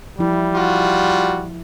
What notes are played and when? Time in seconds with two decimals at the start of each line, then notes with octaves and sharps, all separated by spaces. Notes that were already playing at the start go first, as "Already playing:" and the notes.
0.19 F3 G3 E4
0.54 F4 F#4